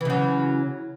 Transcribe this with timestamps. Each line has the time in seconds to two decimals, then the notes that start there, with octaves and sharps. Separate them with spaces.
0.01 E3
0.05 C#3
0.10 F#3